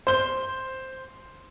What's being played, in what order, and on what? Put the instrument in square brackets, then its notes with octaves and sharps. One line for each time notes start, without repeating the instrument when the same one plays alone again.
[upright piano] C5 G7